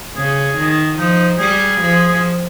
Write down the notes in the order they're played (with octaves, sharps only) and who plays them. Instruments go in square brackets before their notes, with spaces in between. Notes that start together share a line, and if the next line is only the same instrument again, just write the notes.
[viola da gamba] C#3 [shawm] G#4
[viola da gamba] D#3
[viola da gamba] F3 [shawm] D#4
[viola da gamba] G3 [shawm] G#4
[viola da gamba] F3